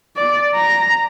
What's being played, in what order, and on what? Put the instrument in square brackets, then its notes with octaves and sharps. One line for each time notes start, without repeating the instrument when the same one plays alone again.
[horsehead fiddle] D5
A#5